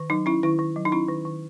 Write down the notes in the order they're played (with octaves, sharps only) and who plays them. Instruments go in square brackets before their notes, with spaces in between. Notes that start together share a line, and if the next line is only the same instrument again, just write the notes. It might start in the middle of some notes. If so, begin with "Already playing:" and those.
Already playing: [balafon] D#3
F#3 D#4
C#4 E4
D#3 E4
D#3
F#3
D#4
C#4 E4
D#3
D#3